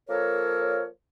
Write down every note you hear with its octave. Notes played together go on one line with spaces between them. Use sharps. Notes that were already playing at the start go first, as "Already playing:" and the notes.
F3 A#3 A4 A#4 C#5